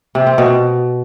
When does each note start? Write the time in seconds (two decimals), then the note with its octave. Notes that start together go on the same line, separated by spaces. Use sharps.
0.15 C3
0.27 C4
0.38 B2